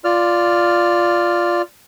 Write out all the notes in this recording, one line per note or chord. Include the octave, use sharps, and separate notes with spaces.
F4 D5 F6